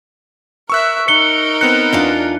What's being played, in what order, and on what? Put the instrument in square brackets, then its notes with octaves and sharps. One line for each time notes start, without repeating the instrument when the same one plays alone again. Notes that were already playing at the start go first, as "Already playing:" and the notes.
[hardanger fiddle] A#4 E5 [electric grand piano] C#6 E6 F#6
[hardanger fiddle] D#4 A#4 [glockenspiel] C#7 G7
[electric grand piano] B3 C4 F#6 [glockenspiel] C#7
[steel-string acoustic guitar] E2 D4 F4